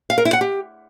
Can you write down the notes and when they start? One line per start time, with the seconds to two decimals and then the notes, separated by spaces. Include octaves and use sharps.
0.10 F5
0.18 A#4
0.25 E4
0.33 F#5
0.41 G4